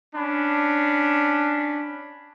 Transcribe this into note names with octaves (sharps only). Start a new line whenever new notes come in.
C#4 D4 B5